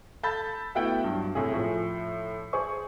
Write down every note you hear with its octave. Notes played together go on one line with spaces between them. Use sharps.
A4 A5 B5 G6 A6
A3 B3 E4 F#4 F#5 G5
G2 F#3
A2 C3 G#4
A2 F3
G#4 C5 C#6